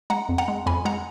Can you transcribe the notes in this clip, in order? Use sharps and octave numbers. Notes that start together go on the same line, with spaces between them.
G#3 F#5 A#5
F2
F#5 A#5
G#3
F2 G#5 B5
G#3 F#5 A#5